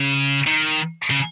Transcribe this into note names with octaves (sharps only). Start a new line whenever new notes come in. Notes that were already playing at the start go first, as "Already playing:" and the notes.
Already playing: C#3
D#3
C#3